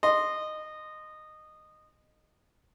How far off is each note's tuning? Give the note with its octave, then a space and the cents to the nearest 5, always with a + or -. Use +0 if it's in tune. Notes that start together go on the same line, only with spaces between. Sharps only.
D#5 -15 C6 +0